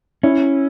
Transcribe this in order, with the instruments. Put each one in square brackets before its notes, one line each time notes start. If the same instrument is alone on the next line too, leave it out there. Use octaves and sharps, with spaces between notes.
[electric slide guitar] C#4 [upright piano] E4